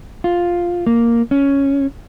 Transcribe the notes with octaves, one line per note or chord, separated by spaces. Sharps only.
F4
A#3
C#4